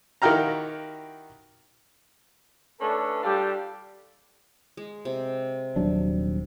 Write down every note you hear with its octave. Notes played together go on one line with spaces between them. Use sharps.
D#3 E4 F#4 G4 F5 A#5
A3 C#4 D4 A4 B4
G3 D4 F4 G4 A4
G#3
C3
D#1 F#3 D4